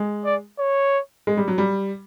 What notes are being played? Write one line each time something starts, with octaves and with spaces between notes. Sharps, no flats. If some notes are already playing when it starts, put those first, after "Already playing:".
Already playing: G#3
D5
C#5
G#3
G3
F#3
G3